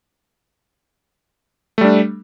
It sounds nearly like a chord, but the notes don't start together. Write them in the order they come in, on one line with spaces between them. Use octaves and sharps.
A3 G3 D4